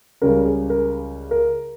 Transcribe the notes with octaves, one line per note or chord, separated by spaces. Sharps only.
C#2 C#3 G3 C#4 A#4
G#4
A#4
A#4